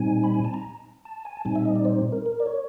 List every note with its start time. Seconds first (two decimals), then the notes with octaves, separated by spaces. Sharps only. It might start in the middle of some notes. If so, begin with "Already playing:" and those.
Already playing: A#2 G3 C4 D#4 G#5
0.24 B5
0.34 G#5
0.44 A5
0.54 A#5
1.05 A5
1.25 G#5
1.37 A5
1.45 A#2 G3 C4 D#4 G#5
1.55 E5
1.65 D#5
1.76 D5
1.85 C5
2.12 A#4
2.26 A#4
2.40 D5
2.46 C#5